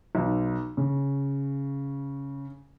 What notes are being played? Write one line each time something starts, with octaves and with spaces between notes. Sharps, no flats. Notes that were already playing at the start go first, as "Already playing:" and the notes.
B1
C#3